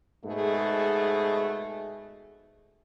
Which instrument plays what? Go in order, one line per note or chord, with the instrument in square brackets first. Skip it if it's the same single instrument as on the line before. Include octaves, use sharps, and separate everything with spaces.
[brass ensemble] G#2 B2 A3 G#4